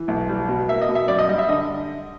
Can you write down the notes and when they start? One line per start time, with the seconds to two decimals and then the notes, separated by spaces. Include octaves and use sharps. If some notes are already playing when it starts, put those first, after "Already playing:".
Already playing: E3
0.08 B1
0.29 G3
0.49 B2
0.68 A#3 E5
0.82 D#5
0.89 B2
0.95 E5
1.08 F#2 D5
1.18 D#5
1.29 G3 D#5
1.38 E5
1.49 D3 D#5